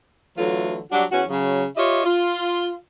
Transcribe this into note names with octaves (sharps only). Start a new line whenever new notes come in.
D3 E3 F#3 A3 F4
F#3 G3 D4 F#4
E2 B3 C#4 F#4
C#3 F#3
F4 G4 C#5 D#5 E5
F4